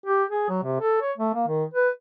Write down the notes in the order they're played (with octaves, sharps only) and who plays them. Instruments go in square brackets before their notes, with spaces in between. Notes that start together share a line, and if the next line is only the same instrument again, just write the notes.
[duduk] G4
G#4
F#3
C3
A4
C#5
A3
A#3
D#3
B4